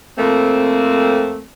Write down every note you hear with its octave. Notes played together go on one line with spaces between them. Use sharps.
F2 A3 A#3 C4